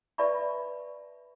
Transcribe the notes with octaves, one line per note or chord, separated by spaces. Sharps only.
B4 D5 E5 A5 B5 C#6